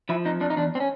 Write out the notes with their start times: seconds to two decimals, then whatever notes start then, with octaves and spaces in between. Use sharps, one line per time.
0.09 F3 E4
0.25 F2 D#4
0.41 F2 D4
0.50 D#4
0.57 E2 D4
0.75 C4
0.80 C#4